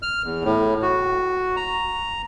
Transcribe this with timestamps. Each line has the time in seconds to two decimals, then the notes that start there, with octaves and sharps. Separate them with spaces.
0.02 F6
0.25 E2
0.44 A2
0.82 F#4
1.56 A#5